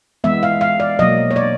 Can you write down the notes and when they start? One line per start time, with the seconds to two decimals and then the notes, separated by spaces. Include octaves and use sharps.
0.24 E3 G#3 B3 E5
0.43 F5
0.61 F5
0.80 D5
0.99 B2 F#3 A#3 D#5
1.31 C#5
1.36 D5